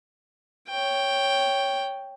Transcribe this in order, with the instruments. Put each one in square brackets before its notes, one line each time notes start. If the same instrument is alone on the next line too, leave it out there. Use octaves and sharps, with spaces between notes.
[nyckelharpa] C#5 G5